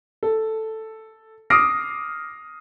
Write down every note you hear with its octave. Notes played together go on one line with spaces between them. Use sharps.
A4
D6 D#6 F6 A#6 C7 D7